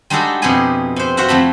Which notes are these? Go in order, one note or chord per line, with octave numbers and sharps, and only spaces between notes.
G3 G#3 D4 D#4 F#4 A4
F2 B2 E4 G4 G#4 G#5
C3 C5
F4 F#4 C5 E5 F#5
F2 A3 A5 B5